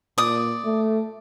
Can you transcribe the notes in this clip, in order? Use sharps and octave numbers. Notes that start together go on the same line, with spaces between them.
A#2 D5 D#6
A3